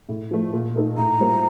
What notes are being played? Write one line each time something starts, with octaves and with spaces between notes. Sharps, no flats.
A2
F3 A3
A#2
A3 D#4 A4
A2 A#5
G3 A#3 F4 C5